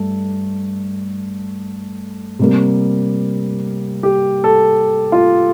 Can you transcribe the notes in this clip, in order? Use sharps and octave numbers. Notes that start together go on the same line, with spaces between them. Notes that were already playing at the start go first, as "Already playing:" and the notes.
Already playing: G2 A3
C3 G3 A#3
G4
A4
F4